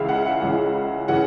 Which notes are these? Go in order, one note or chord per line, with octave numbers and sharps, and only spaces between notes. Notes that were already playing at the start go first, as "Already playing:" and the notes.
Already playing: C#2 C#3 E3 E5 F5
F#5
F#5
C#2 C#3 E3 F#5
C#3 E3 F#5